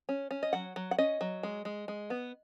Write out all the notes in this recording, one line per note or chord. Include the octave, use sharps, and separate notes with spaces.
C#4
C#4
D#5
F#3 F#5
F#3
F#5
C#4 D#5
F#3
G#3
G#3
G#3
B3